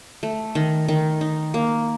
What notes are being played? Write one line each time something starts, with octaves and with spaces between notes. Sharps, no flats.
A3
D#3
D#3
D#4
A#3